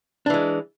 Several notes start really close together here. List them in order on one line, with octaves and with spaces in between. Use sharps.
D4 E3 G#3